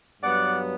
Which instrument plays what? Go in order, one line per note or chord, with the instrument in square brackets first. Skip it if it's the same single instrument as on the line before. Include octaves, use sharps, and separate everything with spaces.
[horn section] G2 F#3 B3 D5 F#5